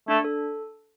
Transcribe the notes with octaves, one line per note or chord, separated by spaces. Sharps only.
A3 D4
A4